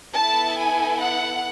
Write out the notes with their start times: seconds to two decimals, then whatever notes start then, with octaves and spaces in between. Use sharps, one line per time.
0.15 B3 E4 A4 A5
0.58 G#5
1.01 F#5